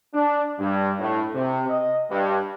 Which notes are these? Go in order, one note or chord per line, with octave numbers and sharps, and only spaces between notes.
D4
G2
A2
C3
D#5
G2